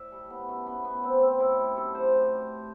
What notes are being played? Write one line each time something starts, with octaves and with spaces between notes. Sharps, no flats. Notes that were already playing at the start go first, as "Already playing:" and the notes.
Already playing: A2 D5 E5
G3 A4
A2 B3
F#2 A3
F#2 B3
A2 B3
A2 C4
A2 C4
A2 E4
G3
F#2 A4
A2 C5
A2
G3